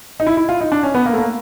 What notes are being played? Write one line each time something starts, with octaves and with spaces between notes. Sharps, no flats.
D#4
E4
E4
F4
D#4
D4
C#4
B3
A#3
A3
A#3